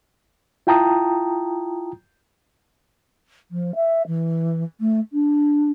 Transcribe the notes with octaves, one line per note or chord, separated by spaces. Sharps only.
E4 F4 G5 A5 A#5 D#6
F3
E5
E3
A3
D4